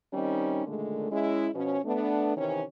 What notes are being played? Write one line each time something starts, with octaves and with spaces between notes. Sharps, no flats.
D#3 G3 C4 C#4 D#4
A#2 D3 D#3 G#3 A3
G#3 C#4 E4
B2 F3 C#4
A3 B3 D4
C3 D#3 E3 C#4